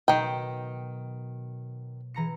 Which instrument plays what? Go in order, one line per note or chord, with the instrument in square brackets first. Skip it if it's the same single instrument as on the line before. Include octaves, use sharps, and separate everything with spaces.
[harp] B2 F#3 [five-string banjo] D#3 G5
[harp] E3 A#5 C#7